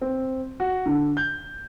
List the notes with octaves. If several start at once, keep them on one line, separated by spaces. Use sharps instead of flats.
C4
F#4
D3
G6